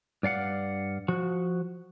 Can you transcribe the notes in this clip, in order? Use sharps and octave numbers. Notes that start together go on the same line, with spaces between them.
G2 D5 F5 F#5
F3 F#4